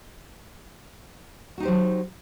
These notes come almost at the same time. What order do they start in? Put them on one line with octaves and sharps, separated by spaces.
F#4 D#4 G4 C5 F#3